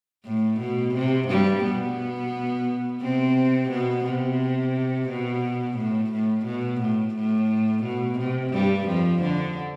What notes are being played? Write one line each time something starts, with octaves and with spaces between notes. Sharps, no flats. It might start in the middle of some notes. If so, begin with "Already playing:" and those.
A2
B2
C3
G2 G3
B2 B3
C3 C4
B2 B3
C3
B2
A2
A2
B2
A2
A2
B2
C3
G2 G3
F2 F3
D3